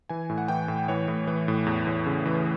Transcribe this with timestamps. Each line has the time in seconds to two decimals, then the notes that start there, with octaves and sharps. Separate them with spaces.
0.09 E3 G#5
0.30 A2
0.38 F#5
0.48 E3 G5
0.68 A2
0.88 E3 C#5
1.08 A2
1.27 E3
1.48 A2
1.66 E2
1.87 E2
2.06 C#3
2.25 E3